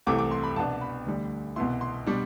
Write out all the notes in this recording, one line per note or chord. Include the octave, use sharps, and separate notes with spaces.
C2 C3 E3 A3 D6
D6
C6
B5
C2 B2 B3 D4 A5
B5
D2 D3 G3
C2 B2 B3 E4 C6
C6
B2 G3 D4